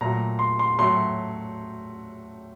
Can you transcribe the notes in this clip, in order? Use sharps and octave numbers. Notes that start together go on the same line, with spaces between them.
A#2 F#3 A3 A#5
C6
C6
A2 F#3 A3 C6